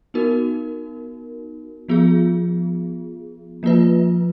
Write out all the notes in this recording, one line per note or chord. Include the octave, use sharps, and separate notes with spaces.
B3 D#4 F#4 A#4
F3 B3 F4 G#4
F3 A#3 F4 B4